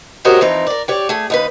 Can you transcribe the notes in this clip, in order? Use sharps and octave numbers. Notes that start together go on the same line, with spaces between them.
F#4 G4 A#4 C5 C#5 D#5
E3 F3 C4 D#4
A#4 D5
G4 C#5 D5
A3 G#4
D#2 D#4 B4